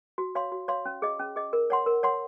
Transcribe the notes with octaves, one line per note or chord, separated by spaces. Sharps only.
F#4
C#5 F5 C6
F#4
C#5 F5 C6
C#4
G#4 D#5
C#4
G#4 D#5
A#4
C#5 F#5 C6
A#4
C#5 F#5 C6